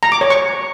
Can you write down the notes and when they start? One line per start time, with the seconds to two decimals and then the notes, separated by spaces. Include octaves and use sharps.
0.03 A#5
0.12 D6
0.21 C#5
0.30 C#6